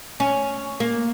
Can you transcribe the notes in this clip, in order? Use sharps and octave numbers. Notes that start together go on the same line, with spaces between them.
C#4
A#3